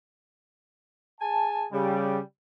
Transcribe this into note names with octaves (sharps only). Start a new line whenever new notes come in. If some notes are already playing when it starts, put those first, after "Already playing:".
G#4 G#5 A5
C#3 G3